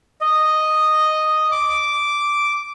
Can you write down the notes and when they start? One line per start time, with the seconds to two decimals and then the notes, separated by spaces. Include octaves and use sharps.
0.21 D#5
1.51 D6